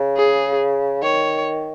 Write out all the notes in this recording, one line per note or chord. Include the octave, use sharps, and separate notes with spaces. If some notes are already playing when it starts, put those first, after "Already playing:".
Already playing: C#3
G#4
D#3 C#5